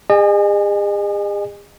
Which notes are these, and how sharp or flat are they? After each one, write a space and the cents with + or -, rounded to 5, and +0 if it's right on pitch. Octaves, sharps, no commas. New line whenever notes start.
G#4 -40 D#5 -40 G#5 +0